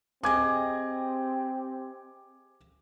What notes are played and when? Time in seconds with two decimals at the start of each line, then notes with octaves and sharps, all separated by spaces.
0.23 C4 G4 G#4 D#5 D6 G#6